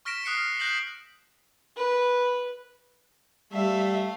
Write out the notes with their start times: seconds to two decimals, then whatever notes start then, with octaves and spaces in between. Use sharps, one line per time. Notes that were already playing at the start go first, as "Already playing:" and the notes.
0.05 C#6 F6 A#6 B6 D7 E7
0.25 D#6 F#6 C7 C#7
0.38 F6
0.60 F#6 G6 A#6 C7 F#7
1.77 B4
3.53 G3 A3 E5 F5